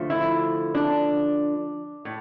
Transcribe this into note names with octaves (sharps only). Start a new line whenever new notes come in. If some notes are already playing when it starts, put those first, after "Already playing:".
Already playing: D3 F3 A3
E4
D4
A2